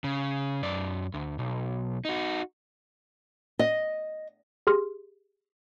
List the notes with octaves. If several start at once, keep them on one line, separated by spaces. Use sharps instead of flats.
C#3
F#2 D5
D2
B1
D#4 F#4
D#5
G4 G#4 C6 F6